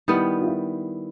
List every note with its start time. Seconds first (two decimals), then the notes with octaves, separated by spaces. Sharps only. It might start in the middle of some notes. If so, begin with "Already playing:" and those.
0.08 D#3 G3 B3 E4
0.41 F4
0.46 E4